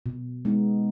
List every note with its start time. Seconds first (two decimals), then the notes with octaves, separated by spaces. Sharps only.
0.06 B2
0.45 G#3 B3 D#4